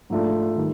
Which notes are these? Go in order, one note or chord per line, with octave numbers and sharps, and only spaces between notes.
G#2 F3 A3 D4 F4
D#3 G3